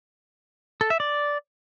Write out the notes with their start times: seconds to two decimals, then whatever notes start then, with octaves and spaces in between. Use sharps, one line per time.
0.81 A4
0.90 E5
1.00 D5